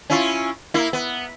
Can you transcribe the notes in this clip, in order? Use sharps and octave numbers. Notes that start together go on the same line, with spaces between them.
C#4 E4 F4
A#3 E4
B3